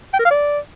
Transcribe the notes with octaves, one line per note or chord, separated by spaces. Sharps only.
G5
A#4
F5
D5